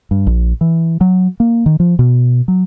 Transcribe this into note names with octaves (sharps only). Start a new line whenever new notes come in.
G2
A#1
E3
F#3
A#3
D#3
F3
B2
F#3